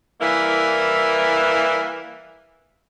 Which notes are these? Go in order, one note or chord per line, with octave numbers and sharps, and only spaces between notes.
E3 G3 A#3 E4 A#4